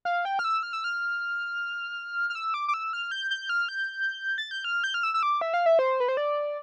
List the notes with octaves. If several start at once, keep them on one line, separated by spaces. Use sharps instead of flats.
F5
G5
F6
E6
F6
E6
F6
F6
E6
D6
D6
E6
F6
G6
G6
F6
G6
A6
G6
F6
G6
F6
E6
E6
D6
E5
F5
E5
C5
B4
C5
D5